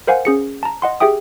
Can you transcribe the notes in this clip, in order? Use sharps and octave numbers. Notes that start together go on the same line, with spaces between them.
A#4 C5 F5 F#5 G#5
C#4 G#4 C#7
A5 A#5
D#5 F#5 C6
G4 G#4 E5 G5 D#6